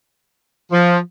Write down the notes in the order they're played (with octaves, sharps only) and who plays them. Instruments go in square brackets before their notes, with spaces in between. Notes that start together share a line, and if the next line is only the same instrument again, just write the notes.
[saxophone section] F3